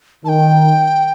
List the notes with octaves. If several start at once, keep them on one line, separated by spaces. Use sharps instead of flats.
D#3 G5 A5